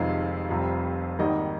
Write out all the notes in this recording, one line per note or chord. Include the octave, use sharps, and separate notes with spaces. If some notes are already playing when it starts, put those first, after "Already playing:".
Already playing: F1 F2 C3 D#3 G#3 F5
F1 F2 C3 G3
G#1 G#2 D#3 G3 A#3 D#5